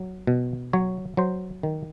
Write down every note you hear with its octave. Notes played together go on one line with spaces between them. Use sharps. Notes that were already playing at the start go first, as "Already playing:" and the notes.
Already playing: F#3
B2
F#3 C#5
F#3 C5
D#3